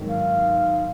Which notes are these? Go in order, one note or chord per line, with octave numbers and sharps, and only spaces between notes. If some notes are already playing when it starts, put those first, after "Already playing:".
Already playing: G#1 G#2 D#3 F#3 A#3
F5